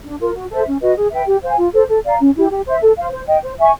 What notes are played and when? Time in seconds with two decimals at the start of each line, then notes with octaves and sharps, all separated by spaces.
0.05 D4
0.19 F4 A#4
0.35 F#4
0.51 A4 C5 E5
0.66 C#4
0.81 F#4 B4 D#5
0.97 G#4
1.12 B4 E5 G5
1.27 G4
1.43 C5 F5 G#5
1.58 F4
1.73 A4 C5
1.89 A4
2.05 D5 F5 A#5
2.20 C#4
2.35 E4 G4
2.51 G4
2.66 C5 E5
2.82 A4
2.97 C5 F5
3.12 C5
3.27 D#5 G5
3.43 C5
3.59 E5 G#5 C#6